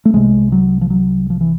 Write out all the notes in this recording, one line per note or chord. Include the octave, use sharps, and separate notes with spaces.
A3
C2 C3 G#3
F#3
F3
F#3
F3
E3